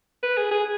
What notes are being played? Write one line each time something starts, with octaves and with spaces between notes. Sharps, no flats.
B4
G#4
G#4